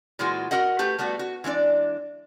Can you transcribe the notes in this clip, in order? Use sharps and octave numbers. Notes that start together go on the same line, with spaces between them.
A#2 E3 G#3 F4 F#4
F#4 A#4 D#5 F#5
A3 G4 B4
G3 A3 B3 F#4
F#4
E3 G#3 D4 D5